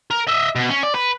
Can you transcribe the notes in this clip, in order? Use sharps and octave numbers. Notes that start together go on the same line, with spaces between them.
A#4
D#5 E5
B2
C#4
D5
B4